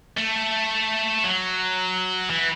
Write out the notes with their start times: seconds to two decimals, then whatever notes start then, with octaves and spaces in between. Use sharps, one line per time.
0.18 A3
1.24 F#3
2.30 E3